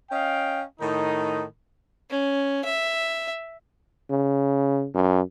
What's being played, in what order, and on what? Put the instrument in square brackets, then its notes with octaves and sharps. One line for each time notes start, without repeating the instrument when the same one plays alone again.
[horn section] C#4 D#5 F5 G5
A2 D#3 D#4
[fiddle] C#4
E5
[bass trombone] C#3
F#2